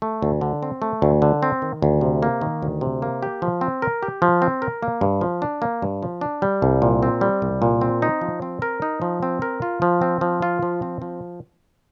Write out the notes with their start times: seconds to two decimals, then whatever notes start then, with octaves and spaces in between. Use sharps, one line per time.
0.02 A3
0.22 D2
0.41 D3
0.63 C4
0.82 A3
1.02 D2
1.22 D3
1.43 C4
1.62 D#3
1.82 D2
2.01 C3
2.23 A#3
2.41 D#3
2.62 D2
2.81 C3
3.02 A#3
3.23 G4
3.42 F3
3.61 C4
3.82 A#4
4.03 G4
4.22 F3
4.42 C4
4.62 A#4
4.83 A#3
5.01 G2
5.21 F3
5.42 D4
5.62 A#3
5.82 G2
6.03 F3
6.21 D4
6.42 G3
6.62 C2
6.82 A#2
7.03 C4
7.21 G3
7.42 C2
7.62 A#2
7.81 C4
8.02 D#4
8.21 F3
8.42 C4
8.62 A#4
8.82 D#4
9.02 F3
9.23 C4
9.42 A#4
9.62 F4
9.82 F3
10.02 C4
10.21 F3
10.42 F4
10.63 F3
10.82 C4
11.02 F3